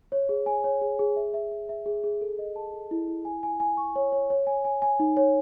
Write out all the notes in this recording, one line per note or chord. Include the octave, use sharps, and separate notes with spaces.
C#5
G#4
G#5
C#5
G#4
G#4
E5
E5
E5
E5
G#4
G#4
A4
D#5
A5
A4
E4
E4
G#5
G#5
G#5
C#6
C#5
C#5
C#5
G#5
G#5
G#5
D#4
C#5